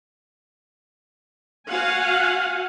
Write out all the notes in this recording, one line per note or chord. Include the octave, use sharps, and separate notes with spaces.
F#4 F5 F#5 G#5